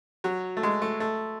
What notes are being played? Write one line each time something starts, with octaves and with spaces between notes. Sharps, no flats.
F#3
A3
G#3
A3
A3